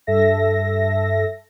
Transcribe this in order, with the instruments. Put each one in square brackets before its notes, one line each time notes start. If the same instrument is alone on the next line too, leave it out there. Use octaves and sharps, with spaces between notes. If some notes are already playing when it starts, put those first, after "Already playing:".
[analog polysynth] G2 A4 E5 A#6